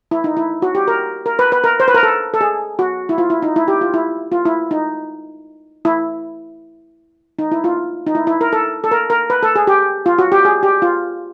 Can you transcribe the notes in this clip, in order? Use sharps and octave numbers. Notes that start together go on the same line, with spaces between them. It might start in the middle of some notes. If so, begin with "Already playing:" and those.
E4
D#4
E4
F#4
G4
A#4
A#4
B4
B4
A#4
C5
B4
A#4
A4
A4
G#4
F#4
E4
F4
E4
D#4
E4
G4
F4
E4
F4
E4
D#4
E4
D#4
E4
F4
D#4
E4
E4
A#4
A4
A4
A#4
A#4
B4
A4
G#4
G4
F4
F#4
G4
G#4
G4
F4